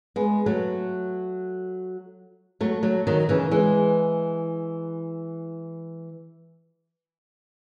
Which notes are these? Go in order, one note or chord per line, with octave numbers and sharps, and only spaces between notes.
G#3 B3
F#3 A3
F#3 A3
F#3 A3
D#3 F#3
C#3 E3
E3 G#3